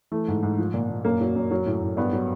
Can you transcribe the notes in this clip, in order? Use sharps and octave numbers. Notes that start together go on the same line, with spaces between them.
E3 A3
G#2
G#2
F3
A#2
A#2
F#2 A#3
F#3
F#2
F#3
A2
A2
G2 B3
F#3